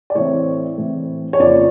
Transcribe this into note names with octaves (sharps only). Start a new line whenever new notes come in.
D5
A2 E3 A3 C4 C#5
A2 E3 A3 C4
C#5
F2 C#3 F3 A#3 D5